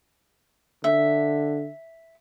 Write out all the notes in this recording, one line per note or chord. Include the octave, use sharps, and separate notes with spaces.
D3 E5